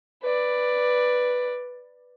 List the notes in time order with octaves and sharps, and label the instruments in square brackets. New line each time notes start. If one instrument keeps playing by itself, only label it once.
[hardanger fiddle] B4 D5